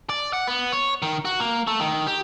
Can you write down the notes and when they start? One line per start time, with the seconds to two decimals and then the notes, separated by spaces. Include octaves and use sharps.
0.10 D5
0.33 F#5
0.47 B3
0.72 C#5
1.02 D#3
1.25 F#4
1.40 A#3
1.67 A3
1.80 D#3
2.07 G4